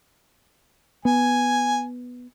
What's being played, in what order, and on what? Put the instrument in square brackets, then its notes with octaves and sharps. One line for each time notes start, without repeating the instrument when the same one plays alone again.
[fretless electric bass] B3 [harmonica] G#5